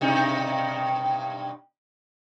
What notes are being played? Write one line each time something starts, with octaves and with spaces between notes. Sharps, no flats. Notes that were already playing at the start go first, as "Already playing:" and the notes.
G2 B2 D#4